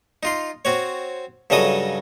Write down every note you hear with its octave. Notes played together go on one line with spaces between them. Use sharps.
D#4 F4 C6
C4 F#4 C#5
G2 C#3 F#3 A4 D#5 D#6